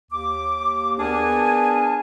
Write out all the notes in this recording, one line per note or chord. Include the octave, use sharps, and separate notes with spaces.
D#2 D6
B3 D4 G#4 A#4 G#5 A5